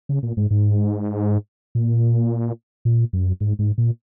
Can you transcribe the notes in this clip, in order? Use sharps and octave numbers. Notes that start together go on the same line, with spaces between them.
C#3
A#2
G#2
G#2
A#2
A#2
F#2
G#2
G#2
A#2